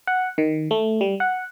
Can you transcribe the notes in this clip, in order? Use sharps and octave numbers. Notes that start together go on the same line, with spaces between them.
F#5
D#3
A3
G3
F#5